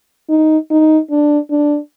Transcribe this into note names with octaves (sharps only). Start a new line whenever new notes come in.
D#4
D#4
D4
D4